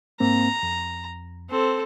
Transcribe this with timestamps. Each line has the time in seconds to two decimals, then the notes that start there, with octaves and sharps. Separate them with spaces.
0.20 G#2 A#3 C4 A#5
0.63 F2
1.50 C4 A4